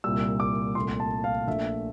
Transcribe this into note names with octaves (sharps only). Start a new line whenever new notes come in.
C2 A#2 G3 E6
D6
C2 A#2 A3 C6
A5
F5
A#1 A#2 A3 E5